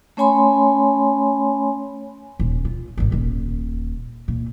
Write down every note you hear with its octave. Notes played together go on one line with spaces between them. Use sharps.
A3 C#4 C#5 G#5 B5 C6
D#1
F4
G#1 G3
D#1
A#2